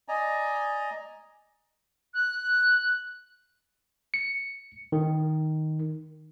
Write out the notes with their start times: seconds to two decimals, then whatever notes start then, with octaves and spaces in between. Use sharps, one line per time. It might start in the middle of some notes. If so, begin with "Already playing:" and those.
0.08 D5 D#5 G#5 A#5
2.14 F#6
4.14 C#7
4.92 D#3